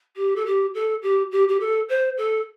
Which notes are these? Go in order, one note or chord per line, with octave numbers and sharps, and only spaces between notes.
G4
A4
G4
A4
G4
G4
G4
A4
C5
A4